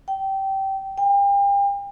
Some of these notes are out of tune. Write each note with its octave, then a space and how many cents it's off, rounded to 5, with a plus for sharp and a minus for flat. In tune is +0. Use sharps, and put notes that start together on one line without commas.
G5 -20
G5 +35